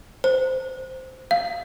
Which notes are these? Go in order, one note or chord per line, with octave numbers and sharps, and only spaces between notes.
C5
F5